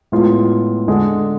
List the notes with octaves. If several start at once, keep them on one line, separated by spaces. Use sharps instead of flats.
A2 G#3 B3 F4
D3 G#3 D4 A4